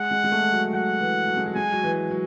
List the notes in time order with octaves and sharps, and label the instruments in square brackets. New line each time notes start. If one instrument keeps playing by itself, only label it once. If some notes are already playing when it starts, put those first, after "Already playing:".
Already playing: [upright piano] G#3 [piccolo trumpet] F#5
[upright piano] G#3
G#3
A3
F#3
[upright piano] F#3 [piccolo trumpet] F#5
[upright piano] E3
F#3
G#3
F#3
[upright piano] G#3 [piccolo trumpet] G#5
[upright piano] F#3
E3
F#3